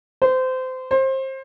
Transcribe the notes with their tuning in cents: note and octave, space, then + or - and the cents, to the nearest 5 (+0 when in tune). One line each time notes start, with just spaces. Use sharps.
C5 -25
C5 +25